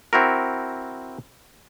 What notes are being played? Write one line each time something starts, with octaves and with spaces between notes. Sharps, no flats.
C4 E4 F#4 A#4